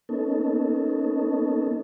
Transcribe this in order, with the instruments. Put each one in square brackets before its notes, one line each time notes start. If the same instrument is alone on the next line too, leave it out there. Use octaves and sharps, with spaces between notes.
[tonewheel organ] A#3 B3 C#4 D#4 A4